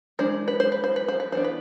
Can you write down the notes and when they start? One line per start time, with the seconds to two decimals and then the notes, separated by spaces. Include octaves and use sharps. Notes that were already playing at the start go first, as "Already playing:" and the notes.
0.19 E3 G#3 D4 C5
0.48 B4
0.60 C5
0.72 B4
0.84 C5
0.96 B4
1.08 C5
1.20 B4
1.32 E3 B3 D4 C5
1.44 B4